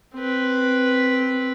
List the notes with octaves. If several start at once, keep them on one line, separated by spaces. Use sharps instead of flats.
C4 B4